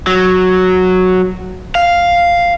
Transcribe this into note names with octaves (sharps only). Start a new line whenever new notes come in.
F#3
F5